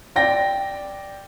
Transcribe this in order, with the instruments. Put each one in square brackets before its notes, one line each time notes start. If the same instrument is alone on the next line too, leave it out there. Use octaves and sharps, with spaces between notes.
[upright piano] D5 G5 A#6